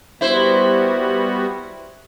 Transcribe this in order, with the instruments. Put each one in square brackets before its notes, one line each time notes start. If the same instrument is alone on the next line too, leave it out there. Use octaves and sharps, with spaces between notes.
[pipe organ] G3 B3 F#4 [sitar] E4 C5